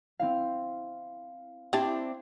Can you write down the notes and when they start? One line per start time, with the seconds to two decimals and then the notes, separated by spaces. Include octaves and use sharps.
0.19 C4 E4 F5
1.73 C4 D4 E4 G4 A5